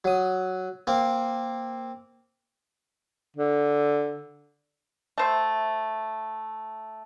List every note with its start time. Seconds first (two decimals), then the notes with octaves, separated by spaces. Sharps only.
0.04 F#3 D#6
0.87 A#3 C4
3.36 D3
5.18 A3 C5 E5